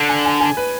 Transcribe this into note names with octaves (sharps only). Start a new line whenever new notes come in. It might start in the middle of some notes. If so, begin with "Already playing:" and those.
Already playing: D3
G#5
G#5
G#5
B4